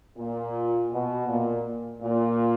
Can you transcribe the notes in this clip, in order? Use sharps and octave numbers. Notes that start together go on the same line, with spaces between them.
A#2
B2
A#2
A#2